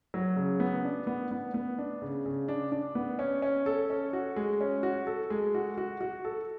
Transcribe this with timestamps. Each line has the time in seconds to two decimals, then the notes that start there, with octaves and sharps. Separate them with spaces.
0.14 F#3
0.36 C#3
0.60 B3
0.84 D4
1.07 B3
1.31 B3
1.54 B3
1.79 D4
2.02 C#3
2.26 C#3
2.48 D4
2.72 D4
2.95 B3
3.19 C#4
3.42 C#4
3.66 A4
3.90 C#4
4.13 F#4
4.36 G#3
4.61 C#4
4.83 F#4
5.07 A4
5.30 G#3
5.55 F#4
5.78 F#4
6.01 F#4
6.25 A4